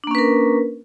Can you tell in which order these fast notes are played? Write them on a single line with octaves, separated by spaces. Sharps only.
D4 A#3 C#4 B4 A#4